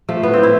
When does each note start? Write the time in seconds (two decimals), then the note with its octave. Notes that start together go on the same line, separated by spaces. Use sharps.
0.09 F3 A3
0.23 A2 B3
0.33 A2 C4
0.43 E4